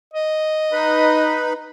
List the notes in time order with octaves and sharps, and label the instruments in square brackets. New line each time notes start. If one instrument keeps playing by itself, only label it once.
[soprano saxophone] D#5
[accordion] D#4 B4 B5